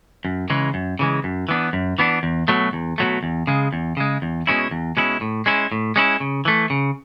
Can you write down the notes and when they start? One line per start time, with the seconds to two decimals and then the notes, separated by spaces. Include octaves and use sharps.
0.25 F#2
0.50 C#3 E3 G#3
0.74 F#2
0.99 C#3 E3 G#3
1.24 F#2
1.49 E3 B3 D4
1.73 F#2
1.99 E3 B3 D4
2.23 E2
2.48 B2 F#3 A3
2.73 E2
2.98 B2 F#3 A3
3.23 E2
3.47 C#3 G#3
3.73 E2
3.97 C#3 G#3
4.22 E2
4.47 B2 G#3 C#4 E4
4.71 E2
4.97 B2 G#3 C#4 E4
5.21 A2
5.46 G#3 C#4 E4
5.72 A2
5.96 G#3 C#4 E4
6.20 C#3
6.45 E3 A3
6.70 C#3